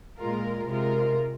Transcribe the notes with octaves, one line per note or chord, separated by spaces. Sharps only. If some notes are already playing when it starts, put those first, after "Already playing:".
A#2 G#3 F4 A#4
C3 G#3 F4 A#4